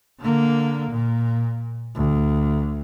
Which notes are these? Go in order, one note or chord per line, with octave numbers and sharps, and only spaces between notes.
D3 A#3
A#2
D2